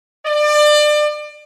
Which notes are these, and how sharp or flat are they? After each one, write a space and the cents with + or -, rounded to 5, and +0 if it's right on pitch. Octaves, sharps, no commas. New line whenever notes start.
D5 +30